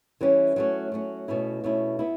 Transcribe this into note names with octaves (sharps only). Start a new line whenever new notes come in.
E3 G3 C#4
F#3 A3 C#4
F#3 A3 C#4
B2 A3 C#4 E4
B2 A3 C#4 E4
B3 E4